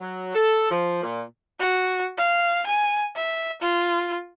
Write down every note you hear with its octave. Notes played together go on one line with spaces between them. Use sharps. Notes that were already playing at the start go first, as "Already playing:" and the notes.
F#3
A4
F3
A#2
F#4
F5
G#5
E5
F4